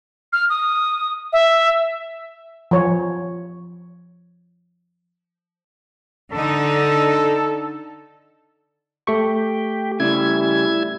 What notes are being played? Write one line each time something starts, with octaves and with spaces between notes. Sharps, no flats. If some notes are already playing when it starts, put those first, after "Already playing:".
F6
D#6
E5
F3 C#5
D3 D#4 A4
A3 G4 C#6
C#3 G3 E4 G#6